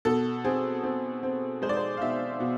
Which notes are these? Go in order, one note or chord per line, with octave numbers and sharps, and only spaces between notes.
B2 A4
C4 G#4
C4
C4
G#3 C5
D5
C5
F5
B2 E5
B2